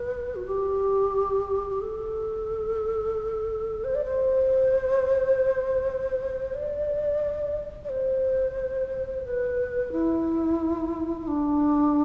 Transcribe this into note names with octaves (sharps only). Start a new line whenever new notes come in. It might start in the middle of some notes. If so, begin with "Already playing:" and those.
Already playing: B4
F#4
G4
G4
A4
C5
D5
C5
D5
D5
C5
B4
E4
E4
D4